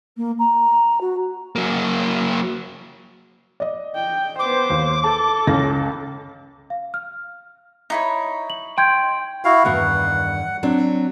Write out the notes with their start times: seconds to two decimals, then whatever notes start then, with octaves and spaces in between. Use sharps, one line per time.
0.17 A#3
0.39 A#5
1.01 F#4
1.56 F#3 A#3
3.60 D5 D#5
3.95 G5
4.39 B3 C5 D6
4.70 D#2
5.04 A4 A5
5.47 C#2 C#4 A#6
6.70 F5
6.94 F6
7.90 D#4 E4 C#5
8.50 F#7
8.78 G5 C6 G6 G#6
9.45 E4 F#4 F5
9.65 E2 G2 D#3 F#5
10.63 F#3 C4 D4